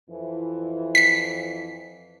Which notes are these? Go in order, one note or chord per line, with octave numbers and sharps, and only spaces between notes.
F2 E3
B6 C7